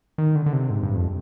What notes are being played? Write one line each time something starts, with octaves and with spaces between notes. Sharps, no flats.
D#3
D3
D3
C3
G#2
G2
F2